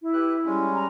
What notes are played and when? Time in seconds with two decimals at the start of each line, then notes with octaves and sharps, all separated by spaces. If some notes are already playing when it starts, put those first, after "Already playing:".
0.02 E4
0.14 G4 B4 F#6
0.45 G3 G#3 C#4
0.73 A#5